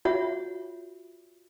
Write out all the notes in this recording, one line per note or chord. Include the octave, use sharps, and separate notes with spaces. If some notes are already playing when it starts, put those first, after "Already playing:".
F4 F#4 C#5 E5 F#5